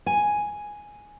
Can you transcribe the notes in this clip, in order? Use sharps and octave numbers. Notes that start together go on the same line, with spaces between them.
G#5